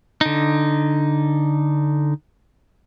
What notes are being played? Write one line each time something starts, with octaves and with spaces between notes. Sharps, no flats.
D3 D#4